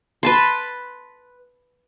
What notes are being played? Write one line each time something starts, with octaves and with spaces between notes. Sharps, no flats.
B4 A5 C6